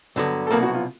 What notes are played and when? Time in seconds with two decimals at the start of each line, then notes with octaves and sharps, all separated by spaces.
0.16 G2 D3 F#3 B3
0.47 A4
0.50 C2 B2 F#3 A#3 B3 A#4
0.63 F#4
0.74 F4